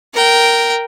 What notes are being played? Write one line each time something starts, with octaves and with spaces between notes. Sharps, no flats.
A#4 G5